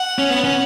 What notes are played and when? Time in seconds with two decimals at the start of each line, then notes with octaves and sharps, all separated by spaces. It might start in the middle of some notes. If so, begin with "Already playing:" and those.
Already playing: F#5
0.18 C#4
0.30 B3 F#5
0.44 C#4